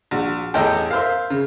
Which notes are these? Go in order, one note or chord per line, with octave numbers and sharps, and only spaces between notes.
A#1 F#4
A1 E2 A4 D#5 G5
A#4 C5 E5 F5
C#3